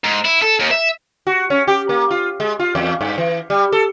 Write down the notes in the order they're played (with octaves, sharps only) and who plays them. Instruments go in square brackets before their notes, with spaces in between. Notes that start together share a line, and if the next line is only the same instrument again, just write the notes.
[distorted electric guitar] G#2
E4
A4
D#2
E5
[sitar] F#4
C#4
G4
A#3
F4
G#3
F4
E2
G2
E3
G3
A4